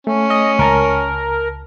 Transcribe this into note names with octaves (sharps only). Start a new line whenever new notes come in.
A3 C#4
D#5
C#2 A#4 A5